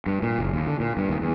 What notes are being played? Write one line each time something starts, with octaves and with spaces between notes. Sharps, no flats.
G2
A#2
F#1
D#2
D3
A#2
G2
D#2
E2